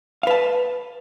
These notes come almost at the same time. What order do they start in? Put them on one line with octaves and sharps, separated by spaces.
F5 B4 A5